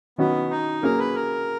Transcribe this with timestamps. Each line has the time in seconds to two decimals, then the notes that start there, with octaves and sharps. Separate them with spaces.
0.18 D#3 F#3 B3 C#4 F#4
0.50 D#4
0.83 F#3 A#3 C#4 G#4 A#4
0.99 B4
1.15 A#4